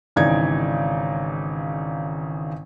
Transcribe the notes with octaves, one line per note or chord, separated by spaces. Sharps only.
G#1 C#3 E3 D#4 D5 G#6